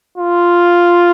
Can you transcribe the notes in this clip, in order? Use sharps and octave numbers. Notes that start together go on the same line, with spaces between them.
F4